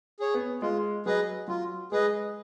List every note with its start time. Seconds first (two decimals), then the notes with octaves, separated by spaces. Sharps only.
0.20 G#4 C#5
0.34 B3
0.62 G#3 F4
1.05 F#3 G#4 B4 D#5
1.48 F#3 F4
1.92 G#3 G#4 B4 D#5